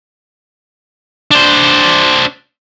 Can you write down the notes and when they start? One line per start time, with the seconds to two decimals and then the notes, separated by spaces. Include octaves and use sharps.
1.31 D4 C5